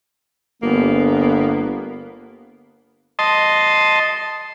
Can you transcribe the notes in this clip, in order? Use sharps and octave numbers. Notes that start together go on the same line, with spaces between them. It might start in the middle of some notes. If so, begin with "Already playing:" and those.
G1 A#3 B3
D#5 A5 C6